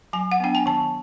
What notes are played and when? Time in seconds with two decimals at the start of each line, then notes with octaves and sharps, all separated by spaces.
0.13 F#3 G#5
0.32 F#5
0.40 B3 D4 G5
0.55 G#5
0.66 D#3 A5